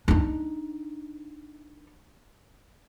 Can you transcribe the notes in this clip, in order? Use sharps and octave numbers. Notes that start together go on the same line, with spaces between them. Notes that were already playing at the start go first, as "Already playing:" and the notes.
D4 D#4